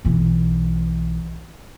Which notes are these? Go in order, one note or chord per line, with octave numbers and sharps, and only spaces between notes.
B1 E3